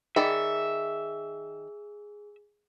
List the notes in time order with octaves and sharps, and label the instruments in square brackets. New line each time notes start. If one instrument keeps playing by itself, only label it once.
[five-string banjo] D#3 D5 B5 [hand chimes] G#4 [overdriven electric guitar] E5